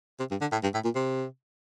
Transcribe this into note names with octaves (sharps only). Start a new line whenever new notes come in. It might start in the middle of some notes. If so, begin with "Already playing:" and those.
C3
G2
D3
A2
G2
A2
A#2
C3